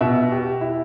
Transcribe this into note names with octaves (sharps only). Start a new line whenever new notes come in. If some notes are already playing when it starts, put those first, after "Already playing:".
B2 E5
G4
E4